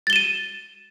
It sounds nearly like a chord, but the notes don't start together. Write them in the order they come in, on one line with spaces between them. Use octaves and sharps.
A6 G7 E7 D#7